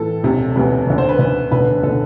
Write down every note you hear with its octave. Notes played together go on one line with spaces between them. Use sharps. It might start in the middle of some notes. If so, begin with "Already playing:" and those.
Already playing: A2 E3 A4
E1 D2 C3
E1 D2 C3 B4
D2 D3
C5
B4
D2 D3 B4
E1 D2 D3 B4
D3 A4